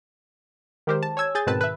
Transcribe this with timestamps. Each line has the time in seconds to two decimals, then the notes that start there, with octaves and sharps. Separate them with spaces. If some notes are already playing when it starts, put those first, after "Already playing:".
0.87 D#3 G#3 G4 A#4 C5
1.03 A5
1.17 C#5 G#5 E6 G#6
1.35 G#4 G#5 G6 A6
1.47 G#2 B2 D#3 C4 B4 A5
1.61 B4 E5